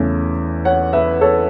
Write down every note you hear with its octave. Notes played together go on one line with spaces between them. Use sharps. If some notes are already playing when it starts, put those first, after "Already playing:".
Already playing: E2 C#3 E3 A3 C#4
C#5 F#5
B4 E5
A4 C#5